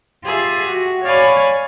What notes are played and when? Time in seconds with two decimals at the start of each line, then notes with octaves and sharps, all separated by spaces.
0.24 F4 G4 G#4 E5
0.65 F#4
1.04 C#5 D5 F5 G#5 B5